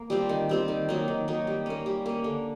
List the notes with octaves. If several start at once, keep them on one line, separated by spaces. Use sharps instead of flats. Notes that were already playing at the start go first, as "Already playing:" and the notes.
Already playing: A#3
G3 C4 F4
D#3
G3 C4 F4
D#3
F#3 A#3 D#4
D#3
F#3 A#3 D#4
G3
A#3 C#4
G3
A#3 C#4
D3